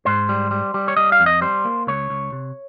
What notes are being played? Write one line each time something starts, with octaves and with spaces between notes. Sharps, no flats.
G#2 C5
G3
G3
G3
C#5
G3 D#5
F5
F2
D#5
G3 C5
A#3
C#2 C#5
C#2
C3